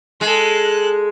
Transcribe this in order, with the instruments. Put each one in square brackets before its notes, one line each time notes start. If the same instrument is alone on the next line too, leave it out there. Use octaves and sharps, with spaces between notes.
[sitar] G#3 [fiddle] A4 F#6